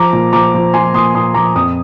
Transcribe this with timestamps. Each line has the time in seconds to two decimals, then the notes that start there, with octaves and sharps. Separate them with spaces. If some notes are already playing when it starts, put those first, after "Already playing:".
Already playing: F3 A#5 D6
0.13 A#2
0.33 F3 A#5 D6
0.54 F3
0.73 F3 G#5 C6
0.94 A#2 C6 D#6
1.14 A#2 C6 D#6
1.34 F3 A#5 D6
1.55 F2 D#6